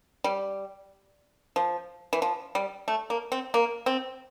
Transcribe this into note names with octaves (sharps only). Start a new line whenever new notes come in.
G3
F3
E3
F3
G3
A3
A#3
C4
A#3
C4